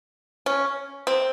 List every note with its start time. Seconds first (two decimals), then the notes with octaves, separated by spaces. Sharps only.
0.46 C#4
1.07 C4